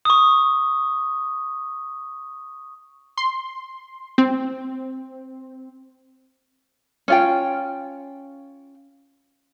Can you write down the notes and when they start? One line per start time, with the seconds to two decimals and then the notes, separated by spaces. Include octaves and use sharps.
0.05 C#6 D#6
3.18 C6
4.18 C4
7.08 C#4 F4 G5